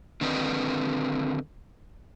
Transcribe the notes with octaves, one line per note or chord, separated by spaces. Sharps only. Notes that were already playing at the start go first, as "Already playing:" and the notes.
D3 D#3 C4 B4 D5 D#5